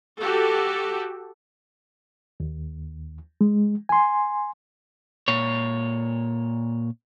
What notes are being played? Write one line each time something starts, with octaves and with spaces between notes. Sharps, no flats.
F#4 G4 A4
D#2
G#3
G#5 C6
A#2 C#5